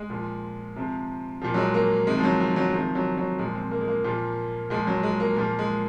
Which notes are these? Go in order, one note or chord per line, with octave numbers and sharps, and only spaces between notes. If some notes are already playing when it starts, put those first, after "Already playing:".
Already playing: G#3
A#2 F3
C3 F3
A#2 F3
F#3
G#3
A#3
C3 D#3 G#3
F3
F#3
F3
F#3
C3 D#3 F3
F#3
F#3
A#2 F3 G#3
C4
A#3
G#3
A#3
A#2 F3
A#2 F3 G#3
F#3
G#3
A#3
A#2 F3 A#3
G#3